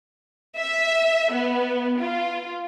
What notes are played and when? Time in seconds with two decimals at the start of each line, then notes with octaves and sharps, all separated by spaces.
0.57 E5
1.32 B3
2.00 F4